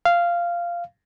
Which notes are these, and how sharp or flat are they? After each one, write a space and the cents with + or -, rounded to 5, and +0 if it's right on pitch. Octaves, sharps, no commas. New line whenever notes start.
F5 -10